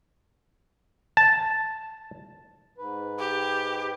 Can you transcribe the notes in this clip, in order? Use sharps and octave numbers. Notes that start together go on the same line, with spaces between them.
A5
G#2 B4
G4